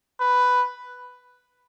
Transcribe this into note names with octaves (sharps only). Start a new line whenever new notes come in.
B4